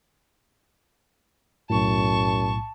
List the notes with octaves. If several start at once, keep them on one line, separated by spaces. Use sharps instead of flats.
B1 F#2 A2 A5 C#6